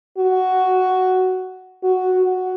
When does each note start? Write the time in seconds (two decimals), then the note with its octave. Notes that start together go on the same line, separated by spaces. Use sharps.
0.18 F#4
1.84 F#4
2.24 F#4